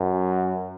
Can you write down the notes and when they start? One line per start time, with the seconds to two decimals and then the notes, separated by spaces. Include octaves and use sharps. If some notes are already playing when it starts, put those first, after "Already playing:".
Already playing: F#2